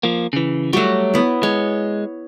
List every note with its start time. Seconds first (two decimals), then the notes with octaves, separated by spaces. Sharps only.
0.03 F3 A#3
0.33 C#3 E3
0.73 F#3 G3 A3 F#4
1.14 B3 E4
1.43 G#3 C#5